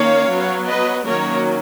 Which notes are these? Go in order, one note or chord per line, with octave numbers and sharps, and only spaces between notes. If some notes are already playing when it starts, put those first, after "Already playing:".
Already playing: D#3 A#3 C#4 C#5 F5
F#3 B3
B4 D#5
D#3 F#3 A#3 C#4 A#4 C#5